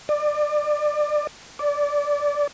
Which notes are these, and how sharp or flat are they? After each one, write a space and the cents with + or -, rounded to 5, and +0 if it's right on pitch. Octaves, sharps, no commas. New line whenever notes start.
D5 +25
D5 -15